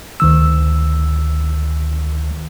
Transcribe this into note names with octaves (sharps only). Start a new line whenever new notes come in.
D2 D#3 E6